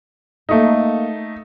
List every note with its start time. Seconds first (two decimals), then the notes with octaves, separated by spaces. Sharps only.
0.49 A3 A#3 D#4 A4 F5